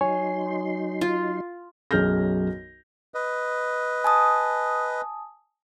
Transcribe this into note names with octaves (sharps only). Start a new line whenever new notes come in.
F#3 D#4 C#5 G#5 C6
F4
B1 F#2 G#4 F6 G6 A#6
B4 D#5
G#5 A5 D#6